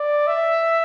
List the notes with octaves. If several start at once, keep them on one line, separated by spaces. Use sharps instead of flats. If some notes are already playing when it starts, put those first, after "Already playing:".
Already playing: D5
E5